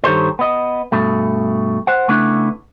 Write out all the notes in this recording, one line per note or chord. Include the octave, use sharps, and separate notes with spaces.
G2 D#3 G4 A4 C5 C#5
B3 D#5
G2 B2 A3
C5 F#5
C#3 A3 B3 D4 E4